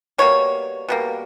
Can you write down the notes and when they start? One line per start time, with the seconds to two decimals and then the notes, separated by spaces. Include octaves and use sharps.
0.18 B2 G3 A#3 C#5
0.89 B2 G3 A#3